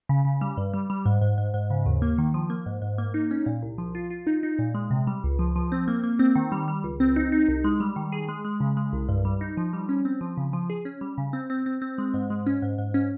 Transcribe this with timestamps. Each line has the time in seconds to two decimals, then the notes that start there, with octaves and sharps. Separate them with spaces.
0.09 C#3
0.25 C#3
0.41 G3
0.57 G2
0.74 G3
0.90 G3
1.06 G#2
1.21 G#2
1.38 G#2
1.54 G#2
1.70 C#3
1.86 D#2
2.02 A#3
2.18 D#3
2.34 F3
2.50 A#3
2.66 G#2
2.82 G#2
2.98 A#3
3.14 D#4
3.31 C#4
3.46 A#2
3.62 C2
3.78 F3
3.95 F4
4.10 F4
4.27 D#4
4.43 D#4
4.59 A#2
4.75 G#3
4.91 C3
5.07 G3
5.24 C#2
5.39 F3
5.56 F3
5.72 C4
5.88 A#3
6.04 A#3
6.19 C4
6.36 D#3
6.52 G3
6.68 G3
6.84 C#2
7.00 C4
7.16 D#4
7.32 D#4
7.48 C2
7.64 G#3
7.80 G3
7.96 D#3
8.12 G#4
8.28 G#3
8.45 G#3
8.60 C#3
8.77 G#3
8.93 C2
9.09 G2
9.25 G3
9.41 D#4
9.57 F3
9.73 G3
9.89 C#4
10.05 C4
10.21 F3
10.37 C#3
10.53 F3
10.70 G#4
10.85 C#4
11.01 G3
11.18 C#3
11.33 C4
11.50 C4
11.66 C4
11.82 C4
11.98 G#3
12.14 G#2
12.30 G#3
12.46 C#4
12.62 G#2
12.78 G#2
12.94 C#4